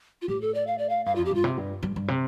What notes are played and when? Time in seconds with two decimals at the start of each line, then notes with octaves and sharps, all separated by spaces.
0.22 F4
0.28 A2 G4
0.41 A4
0.55 D5
0.67 F5
0.78 D5
0.89 F5
1.06 G2 F5
1.15 F2 F4
1.25 G4
1.31 G2 F4
1.44 C3
1.58 G2
1.83 G2
1.96 G2
2.08 C3